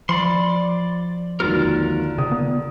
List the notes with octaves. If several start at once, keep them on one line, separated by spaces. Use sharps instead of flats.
F3 D5 B5 C6
G#1 D#2 D3 F4 F#4 A#4
C#3 D#6
B3